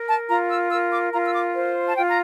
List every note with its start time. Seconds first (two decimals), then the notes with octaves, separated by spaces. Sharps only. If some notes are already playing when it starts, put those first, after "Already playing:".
Already playing: A#4
0.08 A5
0.29 F4 A#5
0.50 E6
0.71 A#4 E6
0.92 D6
1.12 F4 A#5
1.24 E6
1.34 D6
1.54 C5
1.87 A5
1.96 F4 G5
2.07 A#5